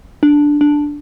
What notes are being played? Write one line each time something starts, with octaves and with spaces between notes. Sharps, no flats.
D4
D4